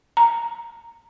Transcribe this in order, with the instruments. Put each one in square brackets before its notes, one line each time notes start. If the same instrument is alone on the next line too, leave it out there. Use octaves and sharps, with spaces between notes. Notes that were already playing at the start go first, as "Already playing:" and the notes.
[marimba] A#5